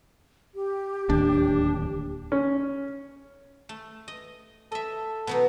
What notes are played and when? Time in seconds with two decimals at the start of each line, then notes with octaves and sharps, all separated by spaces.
0.55 G4
1.10 D1 D#2 D4
2.32 C#4
3.69 A3
4.08 D#5
4.72 A4 D#5 E5
5.27 B2 F#3 D#4